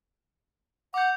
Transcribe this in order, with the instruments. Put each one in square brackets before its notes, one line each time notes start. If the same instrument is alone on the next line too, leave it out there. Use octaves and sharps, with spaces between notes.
[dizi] F#5 [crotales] D6 G6